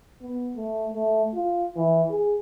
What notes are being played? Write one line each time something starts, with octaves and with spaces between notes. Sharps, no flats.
B3
A3
A3
F4
E3
G#4